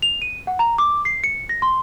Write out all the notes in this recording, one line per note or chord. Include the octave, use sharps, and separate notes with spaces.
F7
D#7
F#5
A#5
D6
C7
C#7
A#6
C6